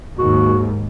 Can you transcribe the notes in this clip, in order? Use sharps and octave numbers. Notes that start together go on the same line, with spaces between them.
D#2 G#2 F#4